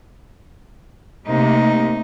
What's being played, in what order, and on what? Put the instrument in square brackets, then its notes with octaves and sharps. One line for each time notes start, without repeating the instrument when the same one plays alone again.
[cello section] C3 A#3 [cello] A3 D#4